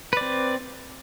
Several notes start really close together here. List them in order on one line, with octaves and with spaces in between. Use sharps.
B4 D5 C4